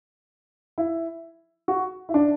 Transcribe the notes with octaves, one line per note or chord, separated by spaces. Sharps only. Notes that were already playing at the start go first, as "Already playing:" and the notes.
E4
F#4
E4
D4